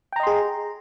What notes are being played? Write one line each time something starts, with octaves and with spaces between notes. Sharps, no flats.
G#4 D#5 G5 A#5 C6